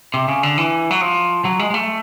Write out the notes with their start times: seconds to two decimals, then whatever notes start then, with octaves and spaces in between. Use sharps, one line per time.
0.14 C3
0.28 C#3
0.43 D3
0.58 E3
0.91 F#3
1.01 F3
1.45 F#3
1.59 G#3
1.70 G#3
1.74 A3